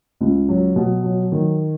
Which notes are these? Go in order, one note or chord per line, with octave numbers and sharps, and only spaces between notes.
C#2
F#3
B2
F#3
D#3